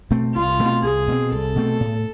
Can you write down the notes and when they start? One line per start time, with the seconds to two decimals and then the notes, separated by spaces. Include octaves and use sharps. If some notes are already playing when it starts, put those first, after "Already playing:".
0.11 B2 A3 C4
0.35 C2 F4
0.60 B2 A3 C4
0.83 C2 G#4
1.08 B2 A3 C4
1.32 C2 A4
1.56 B2 A3 C4
1.80 A2